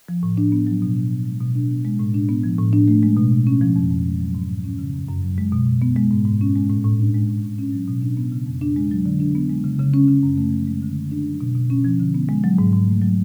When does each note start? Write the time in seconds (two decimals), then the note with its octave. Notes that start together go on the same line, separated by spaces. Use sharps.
0.09 F3
0.23 A2
0.37 D4
0.52 B3
0.67 F#3
0.82 B2
0.96 D4
1.11 B3
1.26 G#3
1.41 B2
1.55 D4
1.70 B3
1.85 G#3
2.00 A2
2.14 D4
2.29 B3
2.44 F3
2.58 A2
2.73 D4
2.88 A3
3.03 G#3
3.17 B2
3.32 B2
3.47 C#4
3.61 F3
3.76 F2
3.90 F2
4.05 G#3
4.20 F#3
4.35 G#2
4.50 G#2
4.64 C#4
4.79 C#3
4.93 F#2
5.09 F#2
5.23 F#3
5.38 G#3
5.52 B2
5.67 B2
5.82 B3
5.96 G#3
6.11 G#2
6.26 G#2
6.41 C#4
6.56 G#3
6.70 A2
6.85 A2
6.99 D4
7.14 G#3
7.29 A2
7.44 A2
7.59 C#4
7.73 F#3
7.88 B2
8.02 D4
8.17 B3
8.32 C#3
8.47 F2
8.61 D4
8.76 G#3
8.91 F#3
9.06 D3
9.20 D4
9.35 B3
9.49 G#3
9.64 C#3
9.79 C#3
9.94 C#4
10.08 C#3
10.23 F#2
10.37 A3
10.52 F3
10.67 G#3
10.82 D3
10.96 D3
11.11 D4
11.26 F#3
11.41 B2
11.55 B2
11.70 C#4
11.85 F3
11.99 D3
12.14 B3
12.29 G#3
12.44 F#3
12.58 G#2
12.73 G#2
12.88 A3
13.02 F#3